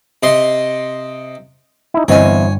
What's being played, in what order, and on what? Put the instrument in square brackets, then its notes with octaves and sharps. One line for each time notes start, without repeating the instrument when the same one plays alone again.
[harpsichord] C3 D#5 C6
[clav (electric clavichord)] D#4 E4
[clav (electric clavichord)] G1 [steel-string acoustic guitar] E2 C4 D#5 [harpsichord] C#5 G#5